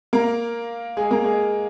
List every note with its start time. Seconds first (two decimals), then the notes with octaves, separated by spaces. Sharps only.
0.13 A#3 A#4
0.97 G#3 G#4
1.11 A#3 A#4
1.24 G#3 G#4